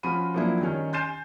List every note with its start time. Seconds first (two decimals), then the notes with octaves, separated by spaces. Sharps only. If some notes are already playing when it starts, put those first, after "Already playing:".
0.03 F3 C#4 F4 F#4 B5 D#7
0.34 F3 F#3 A#3 D4 E4
0.61 D#3 G3 C#4 C#5
0.93 G#5 C6 G6 A6 C7 E7